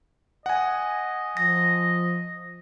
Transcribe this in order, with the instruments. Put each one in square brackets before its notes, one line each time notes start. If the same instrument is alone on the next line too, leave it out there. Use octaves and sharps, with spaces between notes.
[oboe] D#5 [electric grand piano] F#5 G#5
[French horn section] F3 [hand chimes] A#6